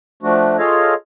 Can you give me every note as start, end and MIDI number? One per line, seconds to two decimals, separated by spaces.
0.23 0.57 53
0.23 0.57 57
0.23 0.57 62
0.23 0.57 66
0.58 0.94 65
0.58 0.94 68
0.58 0.94 69
0.58 0.94 73
0.58 0.94 75
0.58 0.94 77